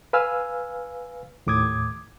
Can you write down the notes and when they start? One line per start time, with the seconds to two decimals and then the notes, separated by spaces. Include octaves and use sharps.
0.13 B4 F5 G#5 E6 F6
1.47 D#2 A2 D6 D#6 G#6